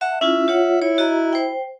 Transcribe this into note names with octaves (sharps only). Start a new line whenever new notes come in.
E5 F#5 A5
C#4 E4 F4 E5
F4 C#5 F#5
E4 C#5
F#4 D#5 A#5
C5 G5